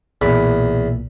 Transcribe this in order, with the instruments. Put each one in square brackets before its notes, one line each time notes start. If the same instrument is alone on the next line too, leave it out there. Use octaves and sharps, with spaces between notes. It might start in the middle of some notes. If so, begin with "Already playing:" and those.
[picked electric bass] B1 A#2 [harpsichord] E2 B5